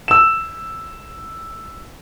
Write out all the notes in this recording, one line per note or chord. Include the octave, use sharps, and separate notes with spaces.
E6 E7